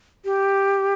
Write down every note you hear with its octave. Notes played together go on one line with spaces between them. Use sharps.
G4